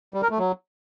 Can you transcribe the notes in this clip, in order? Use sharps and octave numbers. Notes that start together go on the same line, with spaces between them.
G3
A#4
A3
F#3